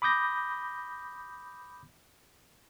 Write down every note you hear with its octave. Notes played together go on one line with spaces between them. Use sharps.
B5 D6 D#6 G6 A#6